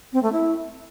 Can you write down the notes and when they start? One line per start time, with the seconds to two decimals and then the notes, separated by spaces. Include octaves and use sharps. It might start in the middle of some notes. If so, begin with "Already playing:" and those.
0.13 C4
0.23 A3
0.33 E4